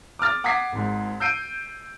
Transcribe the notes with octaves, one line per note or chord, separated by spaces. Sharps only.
D6 D#6 F6 A6
F#5 D6 D#6 G#6 B6 C7
G#1 G#2
E6 G6 C7 D7 D#7